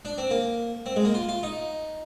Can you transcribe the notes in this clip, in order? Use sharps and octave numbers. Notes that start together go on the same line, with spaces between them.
D4
C4
A#3
C4
G#3
A#3
F4
F4
D#4